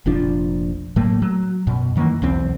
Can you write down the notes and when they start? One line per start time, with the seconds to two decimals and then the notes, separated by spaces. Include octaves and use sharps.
0.06 F1 A#1 F3 D4
0.96 A2 F#3 A3 A#3
1.22 F#3
1.67 F#2 B2
1.96 F#2 D#3 E3 A#3
2.22 B1 E2 C4